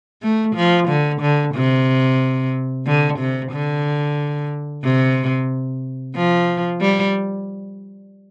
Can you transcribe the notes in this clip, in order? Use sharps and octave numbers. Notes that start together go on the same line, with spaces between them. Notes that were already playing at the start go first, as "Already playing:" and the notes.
A3
F3
D3
D3
C3
D3
C3
D3
C3
F3
G3